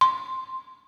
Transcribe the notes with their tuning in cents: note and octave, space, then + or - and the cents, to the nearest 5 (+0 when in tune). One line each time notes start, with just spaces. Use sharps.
C6 +5